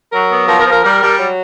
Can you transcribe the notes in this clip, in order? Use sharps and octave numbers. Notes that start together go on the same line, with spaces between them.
F#3 A#4
B3
F3 A#4
A#4
F3
A#4
G3 A#4
G3
F#3